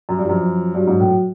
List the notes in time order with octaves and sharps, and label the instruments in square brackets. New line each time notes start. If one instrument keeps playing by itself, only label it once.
[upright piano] F#2
G2
[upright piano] F#2 [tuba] F3
[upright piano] G2 [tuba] F#3
[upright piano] G#2
A2